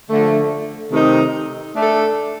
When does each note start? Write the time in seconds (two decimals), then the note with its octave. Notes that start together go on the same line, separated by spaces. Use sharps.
0.09 D3 F3 A3
0.92 C3 D#3 A3 C4 D#4
1.75 A3 D4 A4